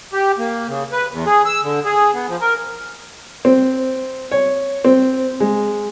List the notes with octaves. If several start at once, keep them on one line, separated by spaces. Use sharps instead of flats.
G4
A#3
C#3
B4
E2
G#4
E6
D3
G#4
B3
F3
A#4
C4
C#5
C4
G#3